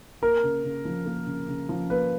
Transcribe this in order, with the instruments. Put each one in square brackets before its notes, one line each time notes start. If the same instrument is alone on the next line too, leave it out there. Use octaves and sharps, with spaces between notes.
[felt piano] A#3 [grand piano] A#4
[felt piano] C#3
C#3
F3
A#3
C#3
C#3
F3
[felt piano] A#3 [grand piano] B4